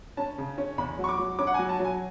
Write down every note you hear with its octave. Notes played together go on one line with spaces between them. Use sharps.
C#4 A5
C#3
C#4
E2 B5
F#3
C#6
D6
F#3
C#4 D6
F#5
F#3 G#5
A5
F#3 G#5